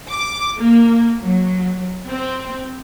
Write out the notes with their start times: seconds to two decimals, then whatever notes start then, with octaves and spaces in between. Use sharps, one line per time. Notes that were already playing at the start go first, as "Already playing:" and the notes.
0.11 D6
0.59 A#3
1.24 F#3
2.08 C4